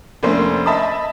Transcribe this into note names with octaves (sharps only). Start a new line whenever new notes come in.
F1 A3 A#3 C#4 D4 C5
D#5 E5 A5 B5 D#6